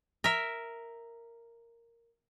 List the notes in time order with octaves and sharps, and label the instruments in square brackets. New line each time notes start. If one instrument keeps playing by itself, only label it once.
[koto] A#4 E5